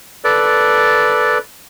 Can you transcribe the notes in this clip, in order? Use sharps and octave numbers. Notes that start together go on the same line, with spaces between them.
A4 B4 D5